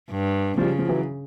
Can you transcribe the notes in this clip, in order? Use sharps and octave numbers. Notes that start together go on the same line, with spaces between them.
G2
C#3 F3 G3
F3
E3 F#3